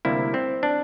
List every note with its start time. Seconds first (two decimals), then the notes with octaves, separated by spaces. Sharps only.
0.05 D2 C3 G3 A#3 E4
0.34 C4
0.63 D4